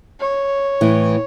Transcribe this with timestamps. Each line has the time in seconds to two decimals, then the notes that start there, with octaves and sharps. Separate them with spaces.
0.20 C#5
0.81 A2 E3